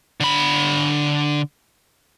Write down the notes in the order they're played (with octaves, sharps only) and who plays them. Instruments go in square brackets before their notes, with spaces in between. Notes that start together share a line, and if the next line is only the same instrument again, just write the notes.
[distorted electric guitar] D3 B5